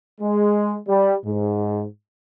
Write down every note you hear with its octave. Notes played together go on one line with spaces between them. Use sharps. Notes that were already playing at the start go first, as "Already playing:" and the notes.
G#3
G3
G#2